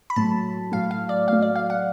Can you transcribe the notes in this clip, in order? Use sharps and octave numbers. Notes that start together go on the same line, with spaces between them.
B5
A2 F#3 A3 A5
A2 F#3 A3 F5
F5
D5
A2 F#3 A3 F5
D5
F5
F#5